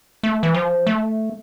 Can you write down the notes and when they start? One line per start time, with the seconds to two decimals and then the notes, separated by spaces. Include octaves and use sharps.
0.23 A3
0.43 E3
0.54 F3
0.87 A3